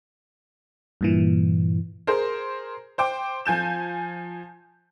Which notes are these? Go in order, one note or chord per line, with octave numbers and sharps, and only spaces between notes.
G2 A#2 E3
G#4 A#4 C5
C5 G5 D6
F3 G#5 G6 E7